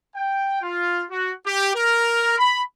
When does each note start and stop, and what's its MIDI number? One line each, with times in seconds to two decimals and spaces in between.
0.16 0.58 79
0.62 1.03 65
1.10 1.32 66
1.46 1.72 67
1.75 2.38 70
2.38 2.61 83